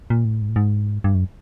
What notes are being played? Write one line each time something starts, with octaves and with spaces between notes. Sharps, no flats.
A#2
A2
G#2
A2
G#2
G2
F#2